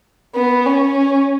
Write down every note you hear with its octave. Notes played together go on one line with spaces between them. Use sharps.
B3
C#4